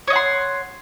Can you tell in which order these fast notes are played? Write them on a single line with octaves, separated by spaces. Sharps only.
C#5 D#5 F#5 C6